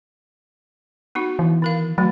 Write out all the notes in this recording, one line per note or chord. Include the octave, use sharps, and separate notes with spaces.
B3 D#4 F#4
E3
D#3 A#4 F5
D#3 F#3 A3